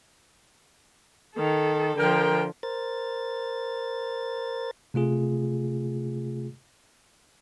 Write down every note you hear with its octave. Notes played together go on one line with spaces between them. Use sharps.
D#3 A4
D3 F3 A#4 G5
A#4 C5 A6
C3 A3 F4 G#4